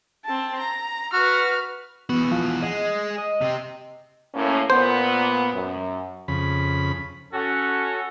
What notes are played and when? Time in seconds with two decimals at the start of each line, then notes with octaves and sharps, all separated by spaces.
0.25 C4 A5
0.59 A#5
1.13 F#4 B4 F6
2.10 E2 B3 F#4
2.32 F3
2.62 G#3 D#5
3.18 D#5
3.41 C3 C4
4.34 A2 A#3 C#4
4.70 A#2 B3 C5
5.53 F#2
6.28 F2 C#3 B5
7.32 C#4 F#4 A4